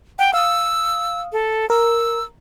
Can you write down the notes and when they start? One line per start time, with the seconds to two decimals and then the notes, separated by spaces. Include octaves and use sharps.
0.19 F#5 G5
0.34 F5 D#6 E6
1.33 A4
1.70 A#4 E6